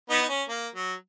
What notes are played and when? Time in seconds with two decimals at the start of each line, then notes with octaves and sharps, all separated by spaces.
0.10 B3 D#4
0.22 D#4
0.29 C#4
0.49 A#3
0.75 F#3